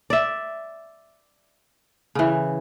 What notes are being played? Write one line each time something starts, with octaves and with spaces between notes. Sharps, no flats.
D5 E5
C#3 E3